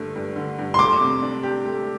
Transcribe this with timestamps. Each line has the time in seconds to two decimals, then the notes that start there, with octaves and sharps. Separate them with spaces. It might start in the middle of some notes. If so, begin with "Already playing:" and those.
Already playing: G2 D3 A3
0.15 G2
0.36 D3
0.58 G2
0.74 C6
0.79 A3 D6
1.01 C3
1.22 D4
1.43 G4
1.65 A3